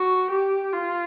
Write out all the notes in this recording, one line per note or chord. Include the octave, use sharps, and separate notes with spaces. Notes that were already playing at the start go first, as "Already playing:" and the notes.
Already playing: F#4
G4
F4